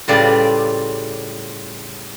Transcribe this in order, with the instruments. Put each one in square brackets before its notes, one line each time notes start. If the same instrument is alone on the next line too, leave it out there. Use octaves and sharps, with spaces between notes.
[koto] A2 C#3 G3 F4 B4 D5